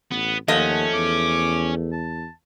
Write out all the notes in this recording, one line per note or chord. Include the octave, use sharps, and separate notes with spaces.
A1 B3
D#2 F3 A3 C#4 D#5 F#5
E2 D6
A5